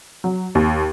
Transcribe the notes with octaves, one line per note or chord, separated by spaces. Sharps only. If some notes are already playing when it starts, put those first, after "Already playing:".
F#3
D#2